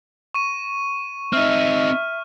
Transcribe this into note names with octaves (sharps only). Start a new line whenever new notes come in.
C#6 D#7
C4 D#4 E5 F6